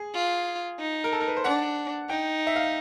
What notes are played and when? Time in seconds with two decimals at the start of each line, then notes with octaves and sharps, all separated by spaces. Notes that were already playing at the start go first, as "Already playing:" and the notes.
Already playing: G#4
0.14 F4
0.79 D#4
1.04 A#4
1.13 A4
1.21 A#4
1.28 B4
1.37 C5
1.44 D4 F#5
2.09 D#4 G5
2.47 E5
2.56 F5